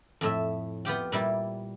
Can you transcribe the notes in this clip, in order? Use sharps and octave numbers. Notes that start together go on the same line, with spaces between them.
F2 A2 E5
B3 F4 G4 G5
A#2 G3 E4